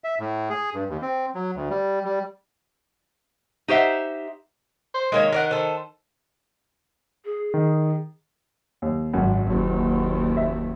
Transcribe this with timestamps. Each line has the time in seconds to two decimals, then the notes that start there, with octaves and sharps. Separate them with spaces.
0.04 E5
0.20 A2
0.50 G#4
0.74 G2
0.89 D#2
1.02 C4
1.35 F#3
1.56 D2
1.70 G3
2.05 G3
3.68 D#4 G4 C5 E5 F#5
4.94 C5
5.12 D#3 G#3 A#3 C#5
5.32 A#4 C#5 F#5
5.51 A4 C5
7.25 G#4
7.54 D#3
8.82 D#2
9.14 G#1 F#2
9.48 F#1 D#2
10.37 E5